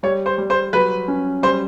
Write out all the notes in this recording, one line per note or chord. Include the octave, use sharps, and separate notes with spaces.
G3 C#5
C5
G3
C5
F#3 B4
C#4
G3 C5